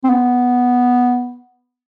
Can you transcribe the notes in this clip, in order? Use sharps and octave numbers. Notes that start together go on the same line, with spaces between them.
C4
B3